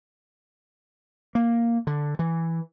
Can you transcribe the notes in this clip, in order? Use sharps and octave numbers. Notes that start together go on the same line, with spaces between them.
A#3
D3
E3